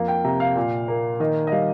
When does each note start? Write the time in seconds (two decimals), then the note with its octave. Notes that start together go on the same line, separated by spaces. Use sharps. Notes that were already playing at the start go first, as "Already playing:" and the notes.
Already playing: F2 A#3 F5
0.08 G5
0.24 C3 A#5
0.40 F5
0.56 A#2
0.88 A#3
1.20 D#3 D#5
1.47 D#5
1.52 G3 F5